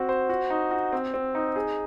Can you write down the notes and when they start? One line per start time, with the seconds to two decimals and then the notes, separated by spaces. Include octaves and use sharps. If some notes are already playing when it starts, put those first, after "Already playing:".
Already playing: C4 F#4
0.09 C5
0.29 F#4
0.50 D#4
0.71 F#4
0.93 C4
1.14 C4
1.35 D#4
1.56 G#4